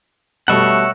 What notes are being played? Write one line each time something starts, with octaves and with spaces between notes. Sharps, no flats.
B2 G3 A3 C#5 E5 F#5